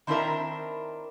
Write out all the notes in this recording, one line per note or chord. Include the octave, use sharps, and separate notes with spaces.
D#3 C4 D4 E4 A#4 E5